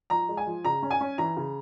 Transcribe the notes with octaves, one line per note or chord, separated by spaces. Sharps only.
F3 A#5
G#3
G#5
F3
C#3 A#5
C#4
G#5
C#4
E3 A#5
C#3